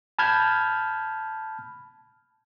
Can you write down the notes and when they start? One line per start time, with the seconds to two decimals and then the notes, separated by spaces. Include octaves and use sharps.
0.19 A5 B5 F6 G6 G#6